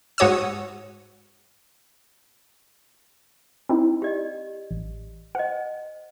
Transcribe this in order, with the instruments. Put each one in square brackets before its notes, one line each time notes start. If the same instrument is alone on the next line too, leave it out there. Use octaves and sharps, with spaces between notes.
[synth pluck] G#2 F#4 C#5 D#6 E6
C4 D#4 E4
[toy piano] G4 D5 D#5
[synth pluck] A1
[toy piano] C5 D#5 [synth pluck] F#5